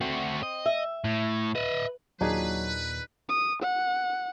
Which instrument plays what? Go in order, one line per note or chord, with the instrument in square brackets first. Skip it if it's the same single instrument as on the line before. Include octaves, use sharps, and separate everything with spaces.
[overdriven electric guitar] A3 F#4 [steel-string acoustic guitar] C4
[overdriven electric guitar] D#5
[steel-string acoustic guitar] E5
[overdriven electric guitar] A2
[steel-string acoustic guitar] B4 [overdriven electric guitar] D#5 E5
[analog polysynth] D#2 A#2 [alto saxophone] F#3 [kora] D4 D#4 G#4 [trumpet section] B4
[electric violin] D#6
F#5